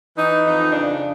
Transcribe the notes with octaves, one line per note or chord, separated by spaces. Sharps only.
E3 D#4
F2 D#4
C#3 D4